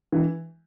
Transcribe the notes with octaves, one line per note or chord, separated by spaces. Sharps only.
E3